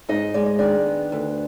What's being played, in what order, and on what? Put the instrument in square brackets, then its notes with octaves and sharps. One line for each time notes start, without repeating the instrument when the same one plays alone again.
[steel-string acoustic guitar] G#2 D#4 D#5
G#3 D5
D#5
D#3 D4 D5
B3
D2